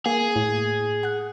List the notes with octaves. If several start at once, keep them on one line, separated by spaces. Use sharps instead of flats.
A#3 G#4
A2
F#5 F#6